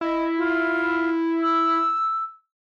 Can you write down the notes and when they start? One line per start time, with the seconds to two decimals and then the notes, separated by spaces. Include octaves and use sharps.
0.01 E4 D#5
0.37 F4
1.42 E6